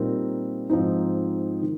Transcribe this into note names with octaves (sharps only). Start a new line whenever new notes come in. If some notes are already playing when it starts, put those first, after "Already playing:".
Already playing: A#2 G3 C4 D#4 A#4
G#2 F3 C4 D#4
D#3